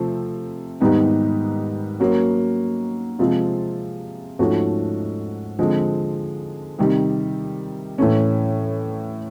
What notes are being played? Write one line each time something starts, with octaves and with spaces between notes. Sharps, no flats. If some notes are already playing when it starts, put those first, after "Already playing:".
Already playing: C3 F3 A3 C4
G#2 D#3 G3 B3 D#4
F#3 A#3 C#4 F#4
C3 F3 G#3 C4 F4
G#2 F3 A3 C#4 F#4
D3 F3 G#3 C4
C3 D#3 G3
A2 E3 A3 C#4